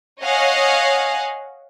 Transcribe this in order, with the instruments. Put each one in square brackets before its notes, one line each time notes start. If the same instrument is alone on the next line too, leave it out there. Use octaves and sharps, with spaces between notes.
[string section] C#5 D#5 F5 F#5 G#5